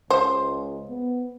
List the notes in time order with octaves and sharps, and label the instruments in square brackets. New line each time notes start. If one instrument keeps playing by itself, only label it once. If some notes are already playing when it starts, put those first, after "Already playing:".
[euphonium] C#2 [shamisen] C5
[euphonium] B3